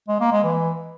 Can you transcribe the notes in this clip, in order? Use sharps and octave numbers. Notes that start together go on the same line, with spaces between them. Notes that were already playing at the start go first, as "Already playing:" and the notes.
G#3
A#3
G#3
E3